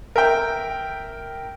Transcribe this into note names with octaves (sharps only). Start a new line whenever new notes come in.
A#4 E5 G5